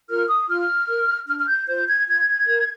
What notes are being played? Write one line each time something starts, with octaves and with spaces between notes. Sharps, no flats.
F4 A#4 F6
D#6
F4 F6
A#4
D4 F6
F6
G6
F4 C5 G6
G#6
F4 G#6
A#4